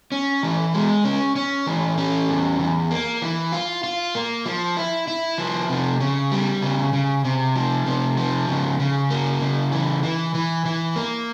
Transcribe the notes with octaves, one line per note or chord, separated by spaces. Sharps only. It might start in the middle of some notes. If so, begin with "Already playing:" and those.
C#4
E3
G#3
C#4
C#4
E3
C#4
E2
E2
A#3
E3
F4
F4
A#3
F3
E4
E4
F3
C3
C#3
G3
C#3
C#3
C3
F3
C3
F3
C#3
C#3
A#3
C#3
E3
E3
E3
E3
A#3